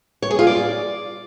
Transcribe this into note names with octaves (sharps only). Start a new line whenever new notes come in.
C#5
G#4
F4
D5